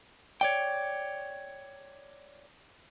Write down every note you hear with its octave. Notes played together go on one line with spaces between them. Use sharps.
C#5 D5 G5